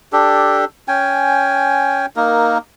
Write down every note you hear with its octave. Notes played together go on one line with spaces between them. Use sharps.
D4 G4 A4
C#4 G5 G#5
A#3 D#4 A#4